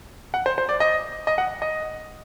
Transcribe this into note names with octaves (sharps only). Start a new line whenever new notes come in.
F#5
C5
C5
D5
D#5
D#5
F#5
D#5